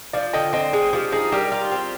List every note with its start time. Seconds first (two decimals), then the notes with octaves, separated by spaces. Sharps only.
0.13 F3 D5 F5
0.33 D3 D#5 G5
0.53 C4 D#5 G5
0.73 G#3 G#4
0.93 F3 G4
1.12 D#4 G#4
1.32 G3 G4 A#4
1.52 F4
1.72 C4